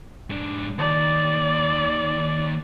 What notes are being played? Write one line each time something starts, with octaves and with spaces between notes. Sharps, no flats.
G#2 D4
D#2 D#3 D5